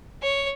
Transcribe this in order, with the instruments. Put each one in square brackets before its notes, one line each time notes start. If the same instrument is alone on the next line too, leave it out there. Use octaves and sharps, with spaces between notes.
[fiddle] C#5